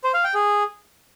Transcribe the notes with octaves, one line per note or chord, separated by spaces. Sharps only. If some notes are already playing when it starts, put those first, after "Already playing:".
C5
F5
G5
G#4